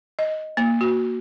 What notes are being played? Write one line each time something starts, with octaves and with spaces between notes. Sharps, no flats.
D#5
A#3
F#4